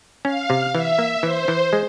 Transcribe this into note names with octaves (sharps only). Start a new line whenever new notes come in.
C#4 F5
C3
E3 E5
A#3
E3 C5
E3
G#3